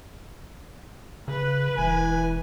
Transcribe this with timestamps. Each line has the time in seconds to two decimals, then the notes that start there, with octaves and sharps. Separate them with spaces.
1.28 C#3 B4
1.78 E1 E3 G#5